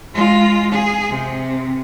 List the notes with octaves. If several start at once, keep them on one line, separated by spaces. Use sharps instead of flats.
G#3 F4
G#4
C3